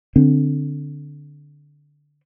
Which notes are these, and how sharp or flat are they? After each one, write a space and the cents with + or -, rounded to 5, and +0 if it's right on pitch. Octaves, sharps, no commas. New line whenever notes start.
D3 +0 C4 +0